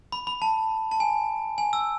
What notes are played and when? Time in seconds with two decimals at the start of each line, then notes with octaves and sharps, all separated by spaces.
0.12 B5
0.27 B5
0.42 A5
0.91 A5
1.00 G#5
1.58 G#5
1.73 E6